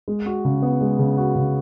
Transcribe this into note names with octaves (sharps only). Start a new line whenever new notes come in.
G#3
F#4
C#3
B3
G#3
C#3
F#4
C#3